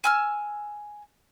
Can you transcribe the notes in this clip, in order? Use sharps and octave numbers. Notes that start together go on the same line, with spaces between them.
G#5 E6 F6